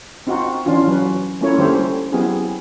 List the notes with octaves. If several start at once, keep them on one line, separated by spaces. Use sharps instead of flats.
C4 D#4 F4 F#4
E3 C#4 D4 F4
F#3 B4
A3 A#3 C#4 E4 F4 C#5
D3 G3 A3 G4 A4 C5
F#3 B3 C4 E4 G4 G#4